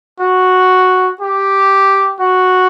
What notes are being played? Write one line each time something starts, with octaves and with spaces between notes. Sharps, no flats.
F#4
G4
F#4